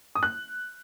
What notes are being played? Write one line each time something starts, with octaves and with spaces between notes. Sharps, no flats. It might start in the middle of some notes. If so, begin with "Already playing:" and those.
D#6
F#6